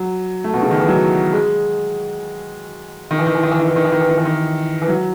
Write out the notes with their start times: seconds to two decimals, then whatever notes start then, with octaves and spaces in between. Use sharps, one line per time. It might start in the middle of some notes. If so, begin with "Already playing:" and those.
Already playing: F#3
0.44 A3
0.53 B2
0.62 C#3
0.71 D#3
0.80 E3
0.88 F#3
1.33 G#3
3.11 D#3
3.19 E3
3.27 D#3
3.35 E3
3.43 D#3
3.51 E3
3.60 D#3
3.68 E3
3.76 D#3
3.84 E3
3.92 D#3
4.01 E3
4.09 D#3
4.17 E3
4.25 D#3
4.82 E3
4.88 F#3